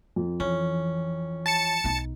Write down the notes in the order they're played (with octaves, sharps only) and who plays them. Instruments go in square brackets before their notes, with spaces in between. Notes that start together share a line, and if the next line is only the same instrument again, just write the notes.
[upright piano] F2
[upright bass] E3 [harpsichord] C#4
[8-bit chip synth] A5 A6 C#7
[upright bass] B1 D#4